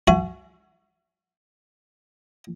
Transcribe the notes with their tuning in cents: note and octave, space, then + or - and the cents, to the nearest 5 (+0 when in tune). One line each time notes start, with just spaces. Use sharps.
F#4 +0 E5 +40 G#5 +20